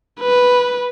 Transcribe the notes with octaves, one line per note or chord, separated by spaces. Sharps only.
B4